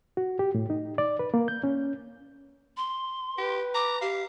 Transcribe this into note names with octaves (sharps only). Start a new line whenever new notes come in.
F#4
G4
A2
D#4
D5
B4
A#3
G6
C#4
C6
G4 B4
A#5 D6
G4 F5